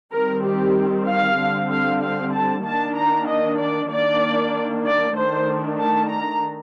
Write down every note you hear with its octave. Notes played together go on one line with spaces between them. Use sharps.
D#3 G3 C4 A#4
G4
F5
D3 G3 C4
F5
F5
A5
D#3 A#3 D4 A5
A#5
D#5
D5
D#3 A#3 D4 D5
D5
D#3 A3 D4 C5
A5
A#5